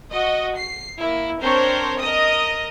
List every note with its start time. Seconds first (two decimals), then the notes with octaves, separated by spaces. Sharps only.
0.11 F#4 D#5
0.57 C7
1.00 A#3 E4
1.41 C4 D4 A#4 C5 C#5
1.99 A#4 D#5 D#6